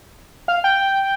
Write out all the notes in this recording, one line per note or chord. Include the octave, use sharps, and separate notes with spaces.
F5
G5